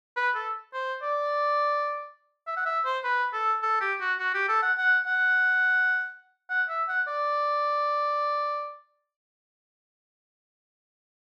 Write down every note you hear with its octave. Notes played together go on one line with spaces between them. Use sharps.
B4
A4
C5
D5
E5
F#5
E5
C5
B4
A4
A4
G4
F#4
F#4
G4
A4
F#5
F#5
F#5
F#5
E5
F#5
D5